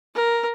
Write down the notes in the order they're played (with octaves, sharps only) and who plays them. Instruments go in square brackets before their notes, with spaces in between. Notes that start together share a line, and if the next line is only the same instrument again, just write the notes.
[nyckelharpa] A#4